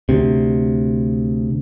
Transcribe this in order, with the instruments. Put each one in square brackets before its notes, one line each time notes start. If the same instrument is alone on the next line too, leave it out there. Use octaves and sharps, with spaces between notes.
[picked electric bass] D2 C3